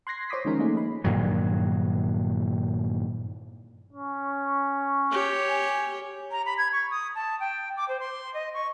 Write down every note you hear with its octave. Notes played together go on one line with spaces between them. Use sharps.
C6 F#6 G#6 A#6 C7
C5 C#5 C6 D6 D#6 B6
D#3 F3 G#3 C#4 D#4 A#4
A3 A#3 D#4 G#4
B5
G2 A#2 D#3 F#3
C#4
G4 C#5
G#5
A#5
B5
G#6
C#6
D#6
A5
G5
D6
C5
C6
D#5
C#6